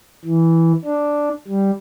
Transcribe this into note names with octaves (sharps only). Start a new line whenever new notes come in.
E3
D4
G3